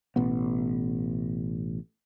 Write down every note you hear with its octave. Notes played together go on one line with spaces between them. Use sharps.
A1 B2 B3